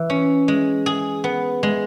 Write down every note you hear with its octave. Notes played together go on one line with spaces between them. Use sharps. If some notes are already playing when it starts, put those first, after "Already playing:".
Already playing: E3
C#4
G#3
G#4
B3
G#3